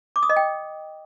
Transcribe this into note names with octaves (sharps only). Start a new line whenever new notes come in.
D6
D#6
D#5
G5